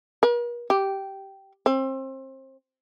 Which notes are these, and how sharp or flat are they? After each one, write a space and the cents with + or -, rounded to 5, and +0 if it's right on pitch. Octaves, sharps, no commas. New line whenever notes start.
A#4 +45
G4 -10
C4 +30